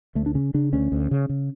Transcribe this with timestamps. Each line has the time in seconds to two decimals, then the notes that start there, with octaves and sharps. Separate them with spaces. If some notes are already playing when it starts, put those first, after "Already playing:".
0.15 D2 A3
0.26 D4
0.35 C#3 C#4
0.54 C#3 D4
0.73 D2 C#4
0.92 D2
1.11 C#3
1.29 C#3